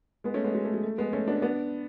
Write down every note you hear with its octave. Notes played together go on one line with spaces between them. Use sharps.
G#3 B3
A3 C#4
G#3 B3
G#3
A3
G#3
A3
G#3 B3
A3 C#4
B3 D4
B3 D4